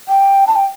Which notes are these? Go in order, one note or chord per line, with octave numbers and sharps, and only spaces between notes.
G5
A5
G5